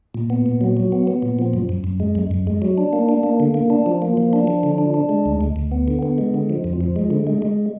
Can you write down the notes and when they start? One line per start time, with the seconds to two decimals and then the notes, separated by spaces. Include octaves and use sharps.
0.14 A#2
0.30 B3
0.46 A#2
0.61 F#3
0.77 F#3
0.92 B3
1.07 B3
1.22 A#2
1.39 F3
1.54 F#2
1.69 F#2
1.84 F#2
2.00 G#3
2.15 F#2
2.31 F#2
2.47 G#3
2.62 F#3
2.78 D4
2.93 A#3
3.09 D4
3.23 A#3
3.40 D3
3.54 A#3
3.70 D4
3.86 F3
4.02 A#3
4.17 F3
4.33 D4
4.47 F3
4.63 D3
4.78 D4
4.94 D4
5.09 G#3
5.26 D2
5.41 D2
5.56 D2
5.72 B3
5.88 D3
6.03 B3
6.18 G#3
6.34 D3
6.50 F3
6.64 F2
6.81 F3
6.96 G#3
7.10 D3
7.27 G#3
7.42 G#3